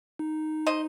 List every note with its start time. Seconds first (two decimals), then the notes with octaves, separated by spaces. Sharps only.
0.19 D#4
0.67 C5 D#5